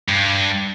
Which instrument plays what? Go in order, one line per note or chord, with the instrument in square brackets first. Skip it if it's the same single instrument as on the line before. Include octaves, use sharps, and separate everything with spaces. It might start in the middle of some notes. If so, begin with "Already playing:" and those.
[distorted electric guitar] G2